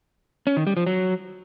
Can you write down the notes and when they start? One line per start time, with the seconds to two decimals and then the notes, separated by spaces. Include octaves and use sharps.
0.47 C#4
0.57 D#3
0.67 G3
0.77 F3
0.87 F#3